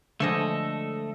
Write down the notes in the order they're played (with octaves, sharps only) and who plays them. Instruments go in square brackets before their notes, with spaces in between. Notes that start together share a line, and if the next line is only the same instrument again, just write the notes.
[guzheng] D3 F3 G#3 [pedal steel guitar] A3 A4 D#5